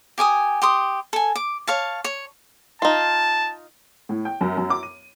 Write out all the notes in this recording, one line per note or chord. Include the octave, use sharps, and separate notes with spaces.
G4 G#5 D6 D#6
G4 C6 D#6
A4 G#5
D6
C#5 F5 A5
C#5
D#4 F4 A5
A2
G5
F#2
F#2
D6
D#7